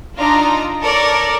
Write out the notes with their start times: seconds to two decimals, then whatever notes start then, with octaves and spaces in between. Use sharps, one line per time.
0.17 D4 D#4 F4 A#5
0.82 A4 A#4 C#5 D5